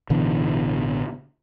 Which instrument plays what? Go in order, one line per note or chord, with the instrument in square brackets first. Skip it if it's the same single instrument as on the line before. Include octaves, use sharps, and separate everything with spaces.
[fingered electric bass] A1 B2 D3 E3